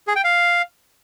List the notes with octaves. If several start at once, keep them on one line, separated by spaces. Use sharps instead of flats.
G#4
G5
F5